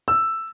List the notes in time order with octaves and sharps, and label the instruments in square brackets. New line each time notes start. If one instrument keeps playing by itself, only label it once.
[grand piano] E6